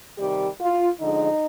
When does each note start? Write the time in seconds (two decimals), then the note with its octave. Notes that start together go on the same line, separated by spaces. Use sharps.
0.18 C3 D#3 G3 G4
0.60 F4
1.00 D3 F3 G#3 D#4